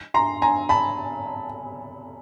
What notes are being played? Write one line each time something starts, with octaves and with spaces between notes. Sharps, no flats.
A#5 C6
G#5 A#5
A5 B5